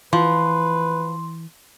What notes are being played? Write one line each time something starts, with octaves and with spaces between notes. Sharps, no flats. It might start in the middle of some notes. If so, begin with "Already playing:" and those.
E3 F3 B4 C6